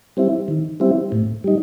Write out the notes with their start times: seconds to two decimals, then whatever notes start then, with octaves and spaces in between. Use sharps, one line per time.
0.17 G3 C4 E4
0.48 D#3
0.80 G3 C4 E4
1.12 A2
1.44 G3 D#4